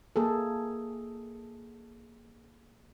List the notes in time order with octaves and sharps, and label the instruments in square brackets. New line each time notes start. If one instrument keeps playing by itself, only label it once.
[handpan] A#3 G#4 A4